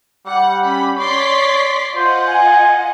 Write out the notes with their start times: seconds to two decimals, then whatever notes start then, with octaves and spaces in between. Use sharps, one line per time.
0.26 G3 F#5
0.62 C#4 B5
0.97 C#5 D5 C6 B6
1.96 F4 C5 D#5 F#5
2.28 G#5